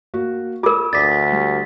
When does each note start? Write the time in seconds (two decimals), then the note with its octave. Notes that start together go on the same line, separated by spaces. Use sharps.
0.14 A#3 F#4
0.63 F4 A#4 D6 E6
0.93 D2 D5 D6 D#6 A6 B6
1.32 G3